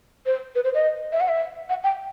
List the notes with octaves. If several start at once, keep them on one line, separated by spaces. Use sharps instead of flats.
C5
B4
C5
D#5
E5
F#5
E5
F#5
G5